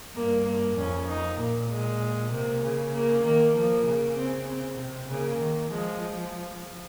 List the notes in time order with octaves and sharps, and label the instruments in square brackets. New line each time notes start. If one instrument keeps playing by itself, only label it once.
[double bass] G2 [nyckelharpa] A#3
[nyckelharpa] A#3
[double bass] F2 [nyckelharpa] C#4
[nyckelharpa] D#4
[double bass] A#2 [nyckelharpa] A#3
[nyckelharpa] G#3
[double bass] C3 [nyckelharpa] A#3
[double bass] C#3
[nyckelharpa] A#3
[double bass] D#3 [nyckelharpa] A#3
[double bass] F3 [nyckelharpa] A#3
[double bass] C#3
[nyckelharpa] C4
C4
[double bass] C3
[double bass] C#3 [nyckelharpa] A#3
[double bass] D#3
[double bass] F3 [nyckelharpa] G#3